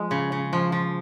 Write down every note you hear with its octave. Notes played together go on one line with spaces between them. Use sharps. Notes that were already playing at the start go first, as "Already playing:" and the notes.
Already playing: F3 G#3
C#3
C#3
F3
F3